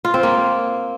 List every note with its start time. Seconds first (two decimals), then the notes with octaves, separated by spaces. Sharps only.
0.05 F4
0.14 C4
0.23 A#3